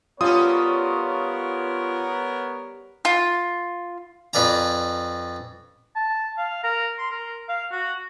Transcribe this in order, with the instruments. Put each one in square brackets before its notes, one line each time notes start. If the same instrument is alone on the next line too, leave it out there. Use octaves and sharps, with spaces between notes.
[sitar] G3 C#4 A4 [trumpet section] B3 A#4 C#5 [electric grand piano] F4 D#6
[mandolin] F4
[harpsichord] F2 B4 D5 G#5 A#5
[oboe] A5
F5
A#4
C6
A#4
F5
F#4